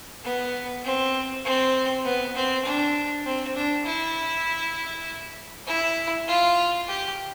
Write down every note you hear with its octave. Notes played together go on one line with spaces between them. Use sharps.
B3
C4
C4
B3
C4
D4
C4
D4
E4
E4
F4
G4